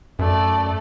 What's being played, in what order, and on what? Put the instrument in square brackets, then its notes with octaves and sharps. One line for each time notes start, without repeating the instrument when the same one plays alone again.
[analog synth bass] F#2 [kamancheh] A3 D5